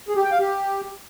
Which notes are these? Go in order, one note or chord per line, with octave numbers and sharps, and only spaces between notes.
G#4
G4
G5
F5
G4